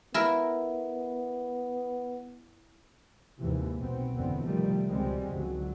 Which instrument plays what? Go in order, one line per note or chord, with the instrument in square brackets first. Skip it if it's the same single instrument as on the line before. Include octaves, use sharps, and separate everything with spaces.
[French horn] B3 [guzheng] E4 A#4
[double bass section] D#2 G#2 C3 E3
B1 B2 B3 C4
F#1 E2 G#2 D3 B3 C4
C3 D#3 F3 G3 A3
C#2 B2 G3 G#3 C4
G#1 C#2 D3 F#3